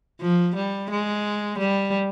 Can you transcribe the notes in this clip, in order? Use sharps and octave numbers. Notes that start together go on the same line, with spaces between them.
F3
G3
G#3
G3